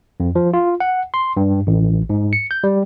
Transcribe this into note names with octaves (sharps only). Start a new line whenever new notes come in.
F2
F3
F4
F#5
C6
G2
A1
G#2
C#7
G6
G3